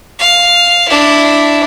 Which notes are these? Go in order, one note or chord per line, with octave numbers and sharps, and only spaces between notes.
F5
D4 E4